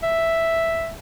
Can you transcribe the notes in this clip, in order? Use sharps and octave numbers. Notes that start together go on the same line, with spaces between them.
E5